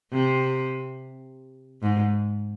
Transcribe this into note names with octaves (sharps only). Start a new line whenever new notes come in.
C3
G#2